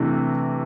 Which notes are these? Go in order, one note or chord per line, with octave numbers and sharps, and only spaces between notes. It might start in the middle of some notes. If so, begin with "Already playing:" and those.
Already playing: C3 E3 A3 D4